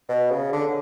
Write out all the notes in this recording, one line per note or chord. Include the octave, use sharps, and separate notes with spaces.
B2
C#3
D3